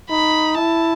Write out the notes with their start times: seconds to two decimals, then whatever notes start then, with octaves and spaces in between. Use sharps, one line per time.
0.11 D#4 B5
0.57 E4 A5